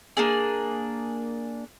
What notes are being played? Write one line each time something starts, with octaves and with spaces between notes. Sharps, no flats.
A#3 D4 G#4